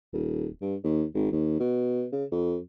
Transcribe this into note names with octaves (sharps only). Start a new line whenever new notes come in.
D#1
G2
D#2
G#1
D#2
B2
C#3
F2